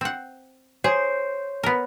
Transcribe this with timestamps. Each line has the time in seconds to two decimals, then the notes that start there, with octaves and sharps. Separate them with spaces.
0.01 C4 F#5
0.84 G#4 C5 C#5
1.63 B3 A#4